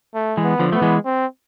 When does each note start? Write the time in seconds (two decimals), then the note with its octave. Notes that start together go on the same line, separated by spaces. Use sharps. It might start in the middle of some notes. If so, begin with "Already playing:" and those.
0.15 A3
0.37 E3 G#3
0.44 B3
0.59 D3 F3
0.72 A3 B3
0.82 E3 G#3
1.05 C4